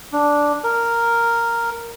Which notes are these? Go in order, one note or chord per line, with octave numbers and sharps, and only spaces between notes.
D4
A#4